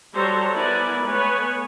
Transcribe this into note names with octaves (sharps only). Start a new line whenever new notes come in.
F#3 G3 A4 C5 C#5 A#5
B3 E4 A#4 D5 G#5 B5
G#3 A3 B3 B4 C#5 G#5